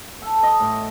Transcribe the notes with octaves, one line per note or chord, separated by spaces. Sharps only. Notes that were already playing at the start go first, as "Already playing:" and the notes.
A4
D#5
A2